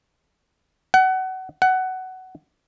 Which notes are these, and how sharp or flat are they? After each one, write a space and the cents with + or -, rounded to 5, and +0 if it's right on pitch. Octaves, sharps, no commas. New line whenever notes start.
F#5 +25
F#5 +15